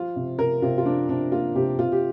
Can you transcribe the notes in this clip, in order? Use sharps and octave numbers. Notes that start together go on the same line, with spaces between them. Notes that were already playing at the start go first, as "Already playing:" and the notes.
Already playing: F3 F4
C3
C3 A#4
C3 F4
F4
F3 D4
C3 D4
A#3 F4
C3 G4
C3 F4
G4